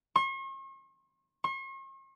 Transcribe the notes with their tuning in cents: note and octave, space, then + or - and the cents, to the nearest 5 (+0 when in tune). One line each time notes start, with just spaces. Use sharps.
C#6 -45
C#6 -45